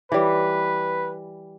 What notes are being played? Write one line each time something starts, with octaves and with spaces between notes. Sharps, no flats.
E3 G3 B4